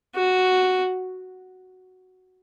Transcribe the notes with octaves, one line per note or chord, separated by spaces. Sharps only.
F#4